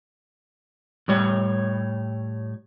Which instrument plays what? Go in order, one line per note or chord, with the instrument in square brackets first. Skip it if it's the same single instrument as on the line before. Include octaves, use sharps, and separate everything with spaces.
[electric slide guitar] A2 G3 C#5